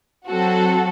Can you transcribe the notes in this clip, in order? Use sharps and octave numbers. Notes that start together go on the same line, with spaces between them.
F#3 C4 F#4 A4